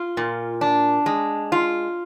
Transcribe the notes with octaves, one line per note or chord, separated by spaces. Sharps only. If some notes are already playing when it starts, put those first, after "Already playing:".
Already playing: F4
A#2
D4
G#3
F4